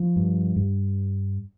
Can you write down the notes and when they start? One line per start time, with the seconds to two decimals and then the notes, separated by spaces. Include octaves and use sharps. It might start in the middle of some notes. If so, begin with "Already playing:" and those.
Already playing: F3
0.16 G2
0.56 G2